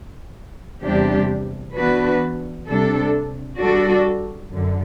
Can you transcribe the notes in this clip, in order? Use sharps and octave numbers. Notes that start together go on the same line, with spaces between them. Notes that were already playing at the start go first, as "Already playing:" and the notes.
E2 C3 G3 D4 G4
E3 B3 D4 F#4 B4
C3 G3 D4 A4
G3 D4 F#4 A4 D5
F#2 D3